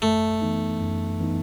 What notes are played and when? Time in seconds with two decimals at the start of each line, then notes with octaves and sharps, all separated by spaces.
0.02 F#2 A3
0.41 E3 B3 D#4
0.81 F#2
1.20 E3 B3 D#4